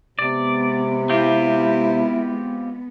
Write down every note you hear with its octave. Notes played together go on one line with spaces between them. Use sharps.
C3 G#3 B3 D5
C4 E4 F4 G4